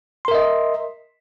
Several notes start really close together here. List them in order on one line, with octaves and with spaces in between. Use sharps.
C6 A#4 E5 D#5